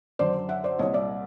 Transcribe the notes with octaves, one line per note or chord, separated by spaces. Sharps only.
F#2 D3 C5 D5
E5 F#5
C5 D5
C2 A#2 C#5 D#5
D5 E5